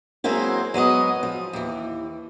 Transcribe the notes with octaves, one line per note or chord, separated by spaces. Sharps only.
F#3 G#3 A#3 C4 E4
F#3 G#3 B3 D#5
F3
D#2 E3